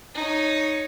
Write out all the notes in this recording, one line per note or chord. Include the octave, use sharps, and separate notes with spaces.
D#4 C#5